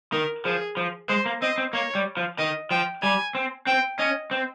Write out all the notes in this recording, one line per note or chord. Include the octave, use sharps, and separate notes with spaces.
D#3 A#4
F3 G#4
F3
G#3 C5
A#3
C4 D#5
C4
A#3 C#5
G3
F3
D#3 D#5
F3 G5
G3 G#5
C4
C4 G5
C#4 D#5
C4